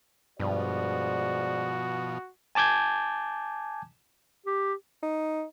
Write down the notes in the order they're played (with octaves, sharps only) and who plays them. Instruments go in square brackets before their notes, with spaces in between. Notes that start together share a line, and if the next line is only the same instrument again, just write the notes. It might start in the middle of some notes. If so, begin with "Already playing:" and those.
[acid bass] G2 [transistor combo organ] B2 F3 [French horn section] G#3 C5 D5 [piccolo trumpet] F#4
[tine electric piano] G#5 A5 D6 G6 G#6
[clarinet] G4
[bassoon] D#4